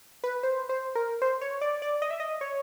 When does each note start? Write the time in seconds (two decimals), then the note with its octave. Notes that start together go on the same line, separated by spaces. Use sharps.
0.24 B4
0.43 C5
0.69 C5
0.95 A#4
1.22 C5
1.41 C#5
1.61 D5
1.82 D5
2.02 D#5
2.11 E5
2.20 D#5
2.41 C#5